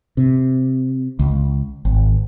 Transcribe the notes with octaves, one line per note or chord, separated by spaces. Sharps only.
C3
C#2
G#1